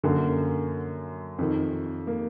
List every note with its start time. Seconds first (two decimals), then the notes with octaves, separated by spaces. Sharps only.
0.04 F#2 D3 A#3
1.39 F2 D#3
2.07 A#3